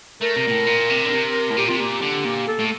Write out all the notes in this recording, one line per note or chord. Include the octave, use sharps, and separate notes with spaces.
A3 A#4
C3
A#2
A2
A#2
C3
D3
C3
A2
A#2 G4
C3 F4
A#2 G4
D3
A#2
A4
A2